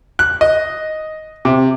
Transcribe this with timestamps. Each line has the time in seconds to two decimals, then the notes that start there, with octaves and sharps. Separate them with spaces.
0.19 F#6
0.41 D#5
1.45 C3